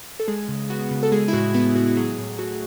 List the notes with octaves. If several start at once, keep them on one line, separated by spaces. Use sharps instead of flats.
A4
G#3 G#4
C#3
B3 F#4
C#3
A4
G#3 G#4
E4
A2 F#4
B3 E4
A2 F#4
F#4
F#3 G#4
A2
A3 F#4